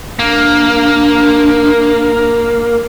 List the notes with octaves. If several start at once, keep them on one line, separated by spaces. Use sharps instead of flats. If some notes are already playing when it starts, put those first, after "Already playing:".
A#3 D4